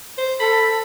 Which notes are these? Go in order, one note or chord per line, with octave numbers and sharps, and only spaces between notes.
C5
A4 B5